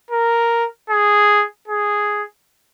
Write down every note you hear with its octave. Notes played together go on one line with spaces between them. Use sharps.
A#4
G#4
G#4